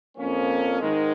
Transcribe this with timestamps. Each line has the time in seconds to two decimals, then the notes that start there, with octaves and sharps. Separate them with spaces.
0.18 F2 F3 A#3 C#4
0.80 G#2 D#3 G#3